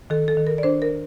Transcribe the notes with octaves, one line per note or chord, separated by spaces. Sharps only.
D#3 A4
A4
D#3
A#4
D5
D4 C5
A#4